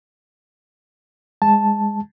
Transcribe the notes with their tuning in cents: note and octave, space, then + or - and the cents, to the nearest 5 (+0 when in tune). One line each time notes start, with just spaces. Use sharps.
G#3 -15 A5 +0